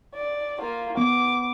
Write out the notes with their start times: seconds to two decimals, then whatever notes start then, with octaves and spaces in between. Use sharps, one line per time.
0.14 D5
0.61 A#3 F4
0.97 B3 D6